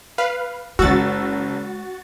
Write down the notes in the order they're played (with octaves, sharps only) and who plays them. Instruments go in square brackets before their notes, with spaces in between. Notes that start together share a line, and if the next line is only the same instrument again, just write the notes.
[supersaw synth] B4 F5
[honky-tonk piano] F#1 E6 [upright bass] G#3 [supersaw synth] F#4 A6